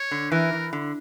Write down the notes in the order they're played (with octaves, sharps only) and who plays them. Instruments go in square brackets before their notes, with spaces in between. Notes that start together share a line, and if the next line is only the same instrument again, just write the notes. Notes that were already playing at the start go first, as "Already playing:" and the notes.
Already playing: [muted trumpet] C#5
[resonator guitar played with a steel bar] D3
[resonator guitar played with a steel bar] E3 [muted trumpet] A#4
[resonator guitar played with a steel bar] E3
D3